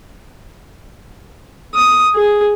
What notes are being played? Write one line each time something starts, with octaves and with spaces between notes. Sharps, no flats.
D#6
G#4